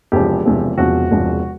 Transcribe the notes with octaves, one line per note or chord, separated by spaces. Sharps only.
E1 E2 C3 F3 G4
E1 E2 C3 F3
E1 E2 C3 F3 F#4
E1 E2 C3 F3